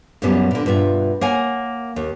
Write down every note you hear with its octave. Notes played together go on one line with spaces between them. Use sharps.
F#2 A#2 F#3 G3 B3 C#4
A#2 D3
G2 B2 F4 E5
A#3 C#5 F#5 G#5
D#2